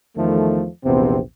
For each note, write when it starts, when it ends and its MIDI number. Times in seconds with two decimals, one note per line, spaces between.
0.17 0.67 40
0.17 0.67 51
0.17 0.67 53
0.17 0.67 57
0.85 1.20 34
0.85 1.20 40
0.85 1.20 48
0.85 1.20 59
0.85 1.20 60